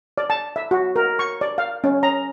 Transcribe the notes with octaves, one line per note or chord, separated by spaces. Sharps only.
D5
A5
E5
F#4
A#4
C#6
D5
F5
C#4
A#5